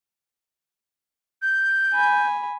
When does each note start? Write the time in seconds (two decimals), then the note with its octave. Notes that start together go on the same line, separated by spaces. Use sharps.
1.42 G6
1.94 G#5 B5